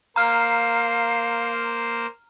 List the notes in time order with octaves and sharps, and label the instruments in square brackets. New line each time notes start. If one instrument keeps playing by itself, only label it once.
[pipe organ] A#3 C5 [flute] F5 [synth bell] A#5 F6